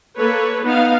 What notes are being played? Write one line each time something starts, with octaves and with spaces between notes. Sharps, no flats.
A#3 A4 B4 C#5
B3 D#4 F5